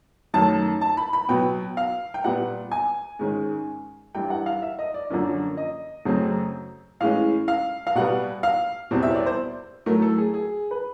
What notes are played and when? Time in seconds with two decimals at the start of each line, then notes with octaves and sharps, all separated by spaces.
0.34 F#2 D#3 F#3 A3 A5
0.81 A5
0.97 B5
1.13 B5
1.28 B2 F#3 B3 G5
1.77 F5
2.14 G5
2.24 A#2 G3 B3 F#5
2.72 G#5
3.19 G#2 D#3 G#3 C#4
4.15 G2 E3 G3 G5
4.30 F#5
4.46 F5
4.62 E5
4.79 D#5
4.94 D5
5.10 F#2 D3 F3 A#3 C#4
5.57 D#5
6.05 F#2 C#3 F#3 A3 C4
7.00 A2 E3 G#3 C#4 F5
7.48 F5
7.87 F5
7.95 B2 G3 B3 F#5
8.43 F5
8.91 E2 B2 G3 C4
9.03 E5
9.10 C#5
9.14 D5
9.26 C5
9.86 A2 F#3 A3 A#4
10.02 A4
10.18 G#4
10.34 G#4
10.71 B4